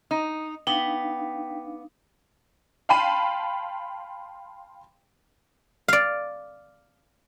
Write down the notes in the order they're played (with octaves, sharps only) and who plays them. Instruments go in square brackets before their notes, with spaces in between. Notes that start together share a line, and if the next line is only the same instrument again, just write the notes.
[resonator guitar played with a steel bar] D#4 [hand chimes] D#6
[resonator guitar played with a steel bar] B3 [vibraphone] D4 D#4 F5 [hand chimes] G5 B6
[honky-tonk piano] F5 G5 A5 B5 C6 D#7
[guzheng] D5 F5